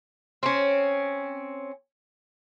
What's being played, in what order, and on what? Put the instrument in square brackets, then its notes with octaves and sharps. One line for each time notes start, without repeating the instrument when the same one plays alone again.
[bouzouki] C4 C#4